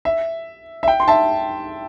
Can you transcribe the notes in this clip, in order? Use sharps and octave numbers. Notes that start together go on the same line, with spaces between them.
E5
E5
G5
C6
E5 A5